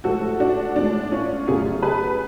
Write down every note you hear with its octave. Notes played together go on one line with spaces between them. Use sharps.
A2 F3 G#3 F#4 A4
D4 F#4
A2 F3 G#3 D4
C#4 F4
F#2 C#3 F#3 A3 F4 G#4
G#4 B4